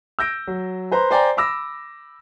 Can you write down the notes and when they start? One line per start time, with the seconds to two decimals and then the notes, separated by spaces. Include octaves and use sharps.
0.19 E6 G6 A#6 D7
0.47 F#3
0.92 B4 C5 A#5 C6
1.11 C5 D5 G5 G#5 A#5
1.37 B5 D6 E6 A#6